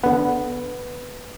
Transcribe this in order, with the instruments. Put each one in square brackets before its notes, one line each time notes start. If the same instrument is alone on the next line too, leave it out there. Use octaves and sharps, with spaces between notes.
[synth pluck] D3 B3 [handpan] B4